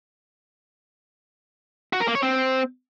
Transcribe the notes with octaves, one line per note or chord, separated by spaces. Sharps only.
F#4
A#4
A#3
C#5
C4